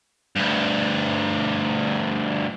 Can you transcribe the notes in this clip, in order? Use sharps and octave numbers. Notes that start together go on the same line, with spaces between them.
D2 G2